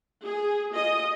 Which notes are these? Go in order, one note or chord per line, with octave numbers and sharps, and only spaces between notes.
G#4
F4 D#5